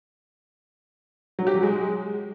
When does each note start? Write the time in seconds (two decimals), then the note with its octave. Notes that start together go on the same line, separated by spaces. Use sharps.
1.39 F#3
1.47 G4
1.55 F#3
1.63 G#3